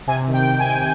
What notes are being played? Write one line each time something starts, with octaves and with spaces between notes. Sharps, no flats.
C3 G#5
D#3
G5
C3
G#5
C3